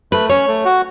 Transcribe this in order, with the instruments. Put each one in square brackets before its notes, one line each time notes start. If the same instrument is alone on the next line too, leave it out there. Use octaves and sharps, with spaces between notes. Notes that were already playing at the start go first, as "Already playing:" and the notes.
[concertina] A3 [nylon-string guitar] B4
[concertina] C#4 [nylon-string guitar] C#5
[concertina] A3
F#4